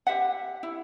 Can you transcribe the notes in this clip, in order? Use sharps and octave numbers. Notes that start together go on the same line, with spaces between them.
G4 E5 F#5
E4